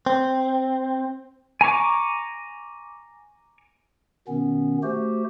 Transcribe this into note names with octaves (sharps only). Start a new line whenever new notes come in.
C4
G#5 A#5 C#6 D6
B2 D#3 B3 C#4
A3 F#4 G4 C5